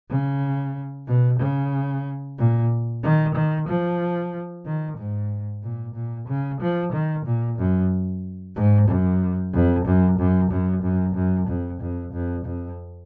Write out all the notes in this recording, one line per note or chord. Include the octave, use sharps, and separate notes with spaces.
C#3
B2
C#3
A#2
D#3
D#3
F3
D#3
G#2
A#2
A#2
C#3
F3
D#3
A#2
F#2
G#2
F#2
F2
F#2
F#2
F#2
F#2
F#2
F2
F2
F2
F2